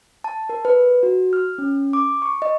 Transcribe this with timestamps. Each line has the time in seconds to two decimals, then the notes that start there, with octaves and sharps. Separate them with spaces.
0.24 A5
0.49 A#4
0.65 B4
1.03 F#4
1.33 F6
1.58 C#4
1.93 D6
2.22 C#6
2.42 D#5